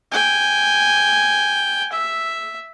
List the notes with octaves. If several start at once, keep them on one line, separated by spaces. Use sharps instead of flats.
G5 G#5
E5